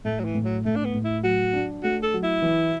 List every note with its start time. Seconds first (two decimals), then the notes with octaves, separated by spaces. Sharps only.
0.04 A2 A3
0.19 F#3
0.25 E3
0.35 A2
0.45 F#3
0.65 A2 A3
0.76 D4
0.85 B3
0.94 A2
1.04 E4
1.23 F#3 F#4
1.53 D4
1.83 A3 F#4
2.03 A4
2.14 F#3
2.23 E4
2.42 E3